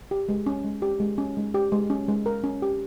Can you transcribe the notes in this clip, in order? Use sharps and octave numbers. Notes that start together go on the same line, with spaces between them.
G4
G#3
C#4
G#3
G4
G#3
C#4
G#3
G4
G#3
C#4
G#3
A#4
C#4
G4